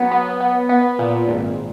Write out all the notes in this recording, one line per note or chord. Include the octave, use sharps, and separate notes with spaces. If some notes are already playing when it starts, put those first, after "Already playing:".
Already playing: F#3 B3
B3
B3
B3
A#2
G#1